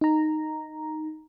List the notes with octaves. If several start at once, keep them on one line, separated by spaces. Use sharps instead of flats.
D#4 A#5